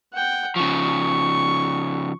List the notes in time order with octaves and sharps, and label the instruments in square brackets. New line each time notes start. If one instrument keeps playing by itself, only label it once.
[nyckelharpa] F#5 G5
[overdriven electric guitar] C#3 F3 [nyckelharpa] C#6